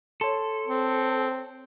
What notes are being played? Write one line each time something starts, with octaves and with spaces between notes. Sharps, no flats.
A4 C#5 C6
C4